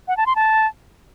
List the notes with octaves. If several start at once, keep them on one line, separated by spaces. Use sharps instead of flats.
F#5
A5
C6
A5